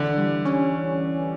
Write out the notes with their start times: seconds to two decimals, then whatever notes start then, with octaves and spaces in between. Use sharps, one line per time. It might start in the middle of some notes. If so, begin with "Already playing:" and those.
Already playing: D3 E3
0.18 G3
0.45 C#4